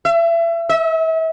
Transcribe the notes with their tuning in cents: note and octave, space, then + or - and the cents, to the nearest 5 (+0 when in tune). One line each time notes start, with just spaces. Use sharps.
E5 +30
E5 -35